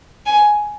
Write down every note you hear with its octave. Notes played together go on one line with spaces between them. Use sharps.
G#5